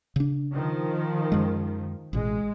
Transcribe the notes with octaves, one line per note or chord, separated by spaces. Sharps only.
C#3 D4
D#3 F3
F#2 G#3
A1 B2 G#3